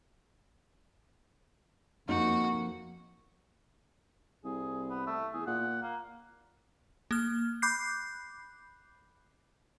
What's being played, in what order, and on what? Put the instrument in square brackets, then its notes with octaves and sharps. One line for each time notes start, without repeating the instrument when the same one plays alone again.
[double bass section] F2 A#3 [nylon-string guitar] D#4 [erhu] F#4
[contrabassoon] C2 [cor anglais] G#4
[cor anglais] B3
A3
[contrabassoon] E2 [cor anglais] G#4
[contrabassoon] A#2 [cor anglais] F#5
[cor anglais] A#3
[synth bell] A#3 F6
B5 D6 F#6 G6 C7